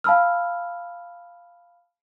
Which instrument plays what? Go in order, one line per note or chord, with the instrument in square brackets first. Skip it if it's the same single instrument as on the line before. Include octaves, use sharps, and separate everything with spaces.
[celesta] F5 A5 B5 E6 F6